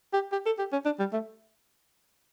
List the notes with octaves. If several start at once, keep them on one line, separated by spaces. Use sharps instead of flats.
G4
G4
A4
G4
C#4
D4
G3
A3